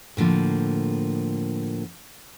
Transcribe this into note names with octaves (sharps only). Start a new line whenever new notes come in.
A2 D3 F3 A#3